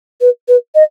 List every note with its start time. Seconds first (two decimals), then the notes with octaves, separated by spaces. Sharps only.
0.21 B4
0.48 B4
0.75 D#5